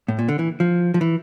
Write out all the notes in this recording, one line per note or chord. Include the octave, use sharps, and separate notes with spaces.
A2
A#2
D3
E3
F3
F3
E3